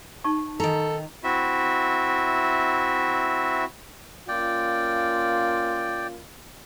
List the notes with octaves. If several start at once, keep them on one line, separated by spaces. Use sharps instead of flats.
D#4 A5 C#6
D#3 A4 A#5
C4 E4 F#4 E5
A#3 C#4 F4 D5 G5